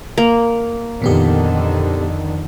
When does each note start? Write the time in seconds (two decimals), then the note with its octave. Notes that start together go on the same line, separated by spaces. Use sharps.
0.18 A#3
1.02 F2 A#2 D3 D#3 B3 G4